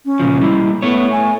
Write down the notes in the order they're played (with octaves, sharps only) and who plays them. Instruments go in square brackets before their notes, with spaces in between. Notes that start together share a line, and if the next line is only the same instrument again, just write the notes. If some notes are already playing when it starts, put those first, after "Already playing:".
[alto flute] C#4
[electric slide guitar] A#2 C#3 F3
[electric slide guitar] G3 A#3 [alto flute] E4
[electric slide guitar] A3 C#5 [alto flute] B3
[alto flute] G#5